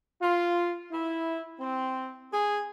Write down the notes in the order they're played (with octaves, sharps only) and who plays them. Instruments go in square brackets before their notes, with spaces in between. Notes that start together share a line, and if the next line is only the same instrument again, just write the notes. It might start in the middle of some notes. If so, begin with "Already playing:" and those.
[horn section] F4
E4
C4
G#4